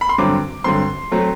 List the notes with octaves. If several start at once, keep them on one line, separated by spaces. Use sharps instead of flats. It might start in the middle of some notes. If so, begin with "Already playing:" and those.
B5
C6
G2 D3 F#3 C4 D6
G2 D3 F#3 C4 C6
F#3 A3 C4